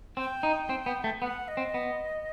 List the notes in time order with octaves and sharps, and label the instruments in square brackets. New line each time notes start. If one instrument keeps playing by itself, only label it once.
[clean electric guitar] C4 [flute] G5
[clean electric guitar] D#4
C4
B3
A3
[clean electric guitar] B3 [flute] F#5
[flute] D#5
[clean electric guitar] C4
B3